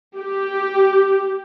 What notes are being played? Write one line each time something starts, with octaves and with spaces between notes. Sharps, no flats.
G4